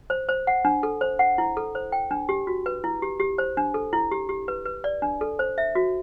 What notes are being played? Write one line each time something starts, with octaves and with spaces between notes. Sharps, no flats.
C5
C5
F#5
D4
A4
C5
F#5
E4
A4
C5
G5
D4
G4
F#4
B4
E4
G4
G4
C5
D4
A4
E4
G4
G4
B4
B4
D5
D4
A4
C5
E5
F#4